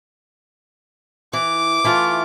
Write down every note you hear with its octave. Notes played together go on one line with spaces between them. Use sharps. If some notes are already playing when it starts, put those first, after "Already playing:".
E3 D6
E3 A3 F4